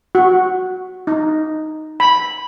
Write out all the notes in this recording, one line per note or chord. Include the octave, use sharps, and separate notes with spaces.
F#4
D#4
B5